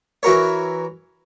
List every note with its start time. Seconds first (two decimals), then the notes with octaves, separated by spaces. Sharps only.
0.23 E3 F#4 A#4 C#5